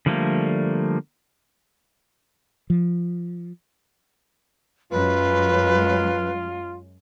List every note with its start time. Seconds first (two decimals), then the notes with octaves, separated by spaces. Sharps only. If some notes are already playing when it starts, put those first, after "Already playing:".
0.06 D3 F3 G3 A3 A#3
2.70 F3
4.91 F#2 F#3 G#3 F4 B4